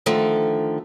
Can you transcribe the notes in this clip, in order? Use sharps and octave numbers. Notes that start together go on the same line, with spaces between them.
D3 D#3 F3 A3